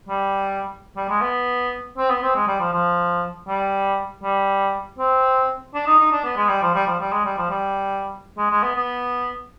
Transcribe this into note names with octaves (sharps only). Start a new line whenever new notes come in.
G3
G3
G#3
B3
C4
B3
C4
G#3
G3
F3
F3
G3
G3
C4
D4
D#4
D#4
D4
B3
G#3
G3
F3
G3
F3
G3
G#3
G3
F3
G3
G#3
G#3
B3
B3